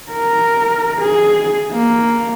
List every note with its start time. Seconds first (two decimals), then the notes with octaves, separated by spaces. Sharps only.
0.12 A#4
1.01 G#4
1.73 A#3